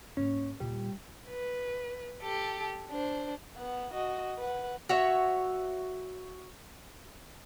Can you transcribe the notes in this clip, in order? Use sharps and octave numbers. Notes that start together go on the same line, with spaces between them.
G#2 A#3 C#4
D#2 A#2 G3
B4
G4 A4
D4 C5
B3 F#5
F#4 D#5
B4 F#5
F#4 C#5 E5